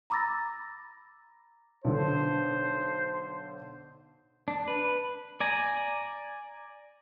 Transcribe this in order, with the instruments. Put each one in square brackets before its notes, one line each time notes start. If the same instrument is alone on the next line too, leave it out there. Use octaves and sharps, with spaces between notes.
[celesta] A#5 B5 D6 E6 A6 A#6
[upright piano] B1 D3 [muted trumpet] C5
[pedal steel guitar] D4
B4
D5 G#5 A#5